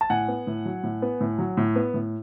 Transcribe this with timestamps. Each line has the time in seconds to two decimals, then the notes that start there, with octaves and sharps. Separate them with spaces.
0.01 A5
0.10 A2 F#5 G#5
0.28 B3
0.47 A2
0.65 F#3
0.84 A2
1.02 B3
1.21 A2
1.38 F#3
1.57 A2
1.76 B3
1.94 A2